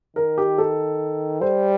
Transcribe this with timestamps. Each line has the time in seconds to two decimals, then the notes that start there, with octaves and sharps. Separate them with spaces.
0.16 D#3 A#4
0.38 G4
0.58 A4
1.41 G3 C5